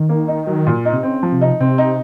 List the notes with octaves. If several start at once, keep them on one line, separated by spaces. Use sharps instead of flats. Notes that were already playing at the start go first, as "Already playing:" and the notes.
Already playing: D#3
A#3
D#4
F#3
A#2
D#4
C3
C#3 C4
F3
C3
D#4
C3 C4
D#4